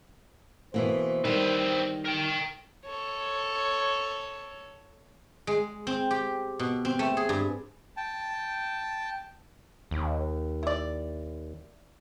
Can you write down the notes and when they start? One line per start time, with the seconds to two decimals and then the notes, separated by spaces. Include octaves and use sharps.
0.74 B2 E3 A#3 C5
1.25 D#3 G3 C4 B4
2.06 A#4 G5
2.86 A4 C#5
5.47 G#3
5.87 C4
6.11 G4
6.59 B2
6.85 C4
6.99 A3
7.17 G#4
7.29 G2
7.97 G5 A5
9.91 D#2
10.63 E4 D5